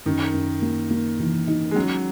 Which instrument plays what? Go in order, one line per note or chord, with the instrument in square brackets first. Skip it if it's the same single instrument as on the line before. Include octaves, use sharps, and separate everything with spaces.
[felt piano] F#2 [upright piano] D#3
[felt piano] F#2
A#3
A#3
E3
D#4
[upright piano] G#3
[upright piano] F#3 [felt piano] C#4